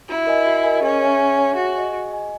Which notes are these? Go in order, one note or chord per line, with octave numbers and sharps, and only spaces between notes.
E4 F#4
A#4 D#5 G#5
F#4
A#4 D#5 G#5
C#4 G#4
C#5 E5 G#5
G#4
C#5 E5 G#5
F#4 G#4
D#5 G#5
G#4
D#5 G#5